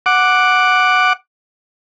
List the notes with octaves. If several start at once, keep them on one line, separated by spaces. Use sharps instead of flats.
F#5 D6